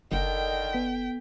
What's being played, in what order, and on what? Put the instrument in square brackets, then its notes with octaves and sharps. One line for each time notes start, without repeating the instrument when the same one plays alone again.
[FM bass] F#1 [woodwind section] D3 D#3 [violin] G5
[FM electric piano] B3 A4 B6